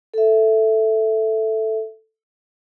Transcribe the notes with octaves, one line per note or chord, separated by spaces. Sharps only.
A4 E5